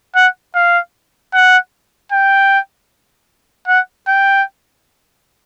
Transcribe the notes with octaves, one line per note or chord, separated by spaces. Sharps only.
F#5
F5
F#5
G5
F#5
G5